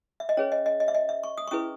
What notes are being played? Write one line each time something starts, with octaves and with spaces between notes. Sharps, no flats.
E5
D#5
C#4 G#4 B4 C#5
D#5
D#5
D#5
E5
D#5
E5
C#6
D#6
C#6
C#4 E4 G#4 B4 D#6